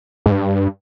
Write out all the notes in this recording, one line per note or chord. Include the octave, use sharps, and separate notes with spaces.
G#2
G2